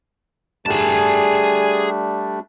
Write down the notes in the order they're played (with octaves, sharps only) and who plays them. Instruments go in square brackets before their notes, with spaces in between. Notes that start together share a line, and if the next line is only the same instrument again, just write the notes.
[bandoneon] G3 A3 D4 [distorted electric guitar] G#4 A5